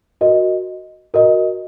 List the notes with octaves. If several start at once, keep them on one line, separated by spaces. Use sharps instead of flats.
F#4 A#4 D#5
F#4 A#4 D#5